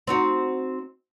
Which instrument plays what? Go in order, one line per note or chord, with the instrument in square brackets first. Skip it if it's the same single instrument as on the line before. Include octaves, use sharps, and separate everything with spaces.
[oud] C4 D#4 F#4